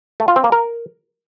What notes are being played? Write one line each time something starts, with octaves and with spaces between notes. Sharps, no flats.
A3
F4
C4
A#3
A#4